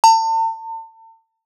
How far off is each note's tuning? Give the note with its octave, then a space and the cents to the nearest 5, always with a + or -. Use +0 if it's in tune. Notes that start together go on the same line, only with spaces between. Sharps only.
A5 +40